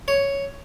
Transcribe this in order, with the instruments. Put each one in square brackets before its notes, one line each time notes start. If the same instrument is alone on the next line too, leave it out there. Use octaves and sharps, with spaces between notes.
[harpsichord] C#5